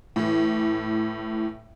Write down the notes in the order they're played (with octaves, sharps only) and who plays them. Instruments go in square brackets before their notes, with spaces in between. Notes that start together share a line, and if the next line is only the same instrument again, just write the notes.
[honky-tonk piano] A2 E3